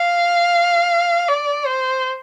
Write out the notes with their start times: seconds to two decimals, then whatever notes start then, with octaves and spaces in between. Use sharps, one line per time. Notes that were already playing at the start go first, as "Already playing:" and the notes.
Already playing: F5
1.29 D5
1.67 C5